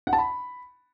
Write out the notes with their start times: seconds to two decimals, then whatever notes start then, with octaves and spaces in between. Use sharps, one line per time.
0.07 F#5
0.13 A5
0.19 B5